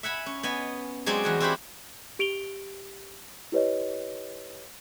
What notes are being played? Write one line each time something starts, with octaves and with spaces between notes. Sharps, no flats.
E5 F#5 G#5 B5
C#4
B3 D#5 G#5
F#3 G#3 C4 G#4 D5 G#5
E2 F#4 G#5
C4 E4 F#4 G4 C5 B5
G4 D7 F7 G7
E4 G4 B4 C#5 D#5